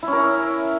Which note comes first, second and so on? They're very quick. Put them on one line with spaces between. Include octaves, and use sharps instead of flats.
E4 C#4 A#4